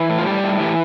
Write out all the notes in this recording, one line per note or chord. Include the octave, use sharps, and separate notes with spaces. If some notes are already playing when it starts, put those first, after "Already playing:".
Already playing: E3
A2
F4
G3 G4
A2
E3 G4